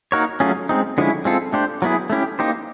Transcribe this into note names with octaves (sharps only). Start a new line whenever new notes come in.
A#3 D#4 F#4 A#4 C#5
F#3 A3 C#4 F4 G#4
G#3 C4 D#4
D3 F3 G#3 C#4 E4
G#3 C4 F4 A4
A3 D4 G4 C5
F#3 B3 E4 G#4
A3 C#4 E4 G4
A#3 D#4 G4 C5